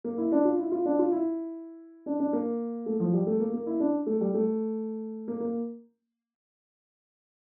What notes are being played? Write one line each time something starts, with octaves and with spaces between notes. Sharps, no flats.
A#3
E4
D4
F4
E4
F4
D4
F4
E4
D4
D4
A#3
A3
F3
G3
A3
A#3
A#3
E4
D4
A3
G3
A3
A#3
A#3